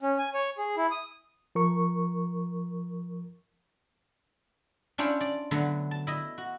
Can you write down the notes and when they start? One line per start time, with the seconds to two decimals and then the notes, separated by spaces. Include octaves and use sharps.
0.02 C#4
0.19 G#5
0.34 C#5
0.58 G#4
0.77 E4
0.91 D#6
1.55 F3 A#4 C#6
4.98 C#4 D4 E4 F4 C5
5.20 D5
5.51 D3 F#3 A3 B3
5.91 A5
6.07 E4 D#5
6.38 F#4